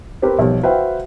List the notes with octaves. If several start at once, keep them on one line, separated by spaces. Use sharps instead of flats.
C4 G4 A#4 B4
B1 F3 G3
F#4 B4 C5 E5 F5 G5